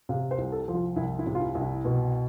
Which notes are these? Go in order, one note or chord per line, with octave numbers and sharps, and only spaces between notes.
C3 F5
C5
C2
A4
F3
F4
C2 E4
E4
C3
F4
E4
C2
E4
B2